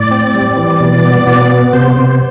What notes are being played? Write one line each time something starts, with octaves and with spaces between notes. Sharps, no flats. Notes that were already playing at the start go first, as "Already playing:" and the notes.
Already playing: A2 D5
C4
G3
E3
B2
B3
B2
B3
C3 C5
C3